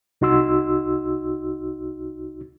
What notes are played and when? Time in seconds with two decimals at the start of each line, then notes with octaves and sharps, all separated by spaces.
0.21 C2 D#4 F#4 C6 E6